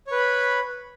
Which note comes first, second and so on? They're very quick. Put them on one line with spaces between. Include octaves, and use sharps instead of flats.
C#5 B4 B5